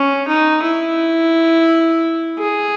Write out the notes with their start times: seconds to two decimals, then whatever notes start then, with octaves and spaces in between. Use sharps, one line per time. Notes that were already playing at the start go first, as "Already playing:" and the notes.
Already playing: C#4
0.28 D#4
0.63 E4
2.39 G#4